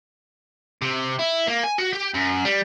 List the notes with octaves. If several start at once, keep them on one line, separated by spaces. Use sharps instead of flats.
C3
E4
A#3
G#5
F#4
G4
F#2
G3